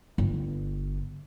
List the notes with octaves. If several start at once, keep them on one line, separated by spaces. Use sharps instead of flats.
G1